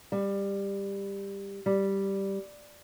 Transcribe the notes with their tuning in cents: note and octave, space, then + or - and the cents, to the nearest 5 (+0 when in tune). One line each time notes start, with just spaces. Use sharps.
G3 +15
G3 -5